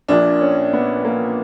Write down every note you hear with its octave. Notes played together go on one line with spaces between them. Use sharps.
A#1 A#2 D4
C#4
B3
A#3